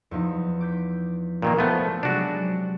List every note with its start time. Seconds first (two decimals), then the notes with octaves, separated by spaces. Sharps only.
0.11 E2 F3 D#4
0.61 D6 G6 B6
1.42 A#2 D#3 A#3 D#4
1.59 F3 A3 B3
2.03 C3 F#3 G#3 D4 F#4